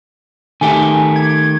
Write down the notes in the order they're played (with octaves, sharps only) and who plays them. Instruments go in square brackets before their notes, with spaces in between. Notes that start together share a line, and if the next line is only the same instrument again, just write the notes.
[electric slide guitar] D#3 A3 G4 [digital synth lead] G#5
[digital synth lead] G#6